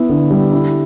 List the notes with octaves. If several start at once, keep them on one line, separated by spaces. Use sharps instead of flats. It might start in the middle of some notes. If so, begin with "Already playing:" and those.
Already playing: B3 E4
D3
G3
E4